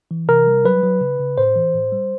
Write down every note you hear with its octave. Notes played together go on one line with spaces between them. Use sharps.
E3
C3 A#4
G3
F#3 B4
F#3
C#3
C#3
A2 C5
E3
A2
G3